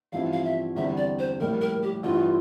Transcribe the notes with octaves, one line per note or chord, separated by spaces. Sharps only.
A1 G2 F3 C4 E4 F5
F5
E5
E2 D3 G3 C4 E4 E5
D5
C5
A#1 A2 G3 A#4
A#4
G4
A1 G2 E3 F4